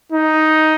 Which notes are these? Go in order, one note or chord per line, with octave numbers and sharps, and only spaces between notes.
D#4